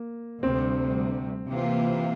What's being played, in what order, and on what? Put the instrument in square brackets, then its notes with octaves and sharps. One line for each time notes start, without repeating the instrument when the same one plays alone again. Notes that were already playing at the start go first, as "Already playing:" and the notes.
Already playing: [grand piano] A#3
[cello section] D2 C3 G3 [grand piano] C4
[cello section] C3 E3 A#3 F4